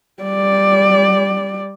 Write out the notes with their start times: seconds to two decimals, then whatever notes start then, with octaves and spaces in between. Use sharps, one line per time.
0.23 G3 D5